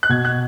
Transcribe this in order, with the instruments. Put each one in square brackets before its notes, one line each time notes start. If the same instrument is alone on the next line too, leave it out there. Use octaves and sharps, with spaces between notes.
[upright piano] F#6
[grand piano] B2 [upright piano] G#6
[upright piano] F#6